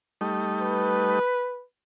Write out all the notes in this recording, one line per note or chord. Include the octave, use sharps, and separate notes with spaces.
G3 A3 D#4
B4